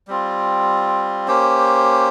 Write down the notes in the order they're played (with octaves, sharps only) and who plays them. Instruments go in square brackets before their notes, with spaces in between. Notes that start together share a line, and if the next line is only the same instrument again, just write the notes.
[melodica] G3 C4 F4
A#3 C#4 G4 C5